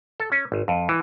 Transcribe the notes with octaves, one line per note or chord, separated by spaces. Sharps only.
A4
C#4
G#1
F2
E3